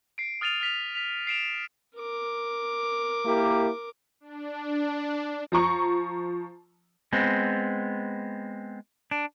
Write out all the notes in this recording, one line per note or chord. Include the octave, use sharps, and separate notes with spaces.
C7 D7
D#6 F6 A6 D#7 F7
F6 B6 F7
B6 F7
C7 D7 E7 F7
A#4 D6
A#3 E4 G4
D4
F3 A#5 C#6
G#3 B3 C4
D4